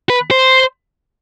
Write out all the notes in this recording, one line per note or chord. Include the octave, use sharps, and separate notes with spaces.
B4
C5